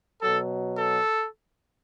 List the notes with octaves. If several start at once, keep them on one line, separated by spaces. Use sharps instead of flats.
B2 F#3 A4
A4